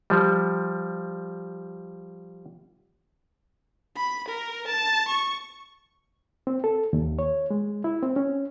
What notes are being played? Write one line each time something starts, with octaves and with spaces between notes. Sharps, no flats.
F3 G3
B5
A#4
A5
C#6
C4
A4
D#2
C#5
G#3
E4
C4
C#4